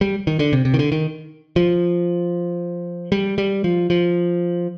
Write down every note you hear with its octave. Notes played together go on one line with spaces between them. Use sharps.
G3
D#3
D3
C3
C3
D#3
D3
D#3
F3
G3
G3
F3
F3